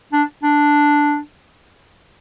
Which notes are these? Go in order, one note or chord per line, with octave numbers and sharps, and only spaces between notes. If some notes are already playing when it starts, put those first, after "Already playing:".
D4
D4